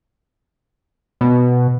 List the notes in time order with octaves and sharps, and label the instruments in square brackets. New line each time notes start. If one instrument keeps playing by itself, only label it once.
[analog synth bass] B2